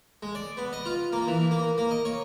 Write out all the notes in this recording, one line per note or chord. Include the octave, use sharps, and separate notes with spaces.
G#3
D5
B3
D#5
F4
A#3
E3
A#3
A#3
D#5
C#5